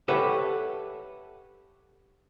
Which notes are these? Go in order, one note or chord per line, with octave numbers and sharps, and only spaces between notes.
G4 A4 B4 C#5 E5 F#5